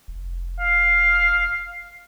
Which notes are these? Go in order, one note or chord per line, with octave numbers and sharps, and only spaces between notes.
F1
F5